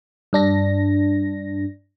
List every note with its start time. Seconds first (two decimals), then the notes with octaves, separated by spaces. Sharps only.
0.33 G2 D4 A#6